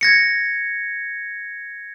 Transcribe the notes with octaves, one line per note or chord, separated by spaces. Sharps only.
G#6 A#6 C#7